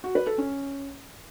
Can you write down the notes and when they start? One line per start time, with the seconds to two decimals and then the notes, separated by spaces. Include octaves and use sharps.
0.04 F#4
0.15 B4
0.27 A4
0.38 C#4